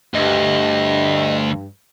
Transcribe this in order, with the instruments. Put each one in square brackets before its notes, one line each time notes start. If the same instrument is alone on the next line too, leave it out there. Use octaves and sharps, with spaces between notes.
[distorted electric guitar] D2 [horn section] G2 [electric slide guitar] D#5